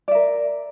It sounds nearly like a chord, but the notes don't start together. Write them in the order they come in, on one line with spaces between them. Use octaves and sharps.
D5 E5 A#4